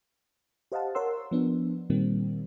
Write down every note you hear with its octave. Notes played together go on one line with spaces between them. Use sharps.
G4 C5 D#5 F5 F#5 A5
A#4 C#5 F#5 C6 E6
F3 B3 D4
A#2 D#3 G3 A#3 C4